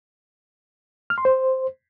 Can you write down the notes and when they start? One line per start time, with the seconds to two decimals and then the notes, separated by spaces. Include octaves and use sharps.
1.10 F6
1.18 C6
1.25 C5